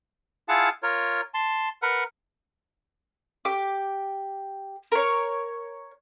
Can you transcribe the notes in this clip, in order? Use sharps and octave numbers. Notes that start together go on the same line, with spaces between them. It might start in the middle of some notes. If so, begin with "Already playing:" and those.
E4 F4 G#4 F5 F#5 A5
F4 A#4 C#5
A5 C6
A#4 B4 F#5
G4 D6
A#4 C#5